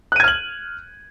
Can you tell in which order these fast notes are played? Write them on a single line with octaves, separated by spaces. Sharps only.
F#6 D#7 G#6 F6 F#7